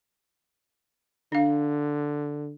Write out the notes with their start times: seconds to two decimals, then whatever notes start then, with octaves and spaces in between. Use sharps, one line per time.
1.32 D3 D4 F5